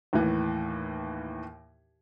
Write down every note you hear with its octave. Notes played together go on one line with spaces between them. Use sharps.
D#2 A2 E3